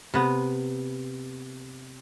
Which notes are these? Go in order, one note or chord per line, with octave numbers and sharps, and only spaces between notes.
C3 B3